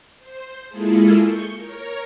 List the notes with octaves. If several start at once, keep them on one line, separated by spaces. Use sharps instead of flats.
C5
G#3 A#3 E4 F4 G#4 A4
C#6 G6
A#4 C#5